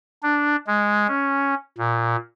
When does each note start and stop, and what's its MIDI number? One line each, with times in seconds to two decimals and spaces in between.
0.23 0.56 62
0.67 1.07 56
1.08 1.54 61
1.78 2.16 46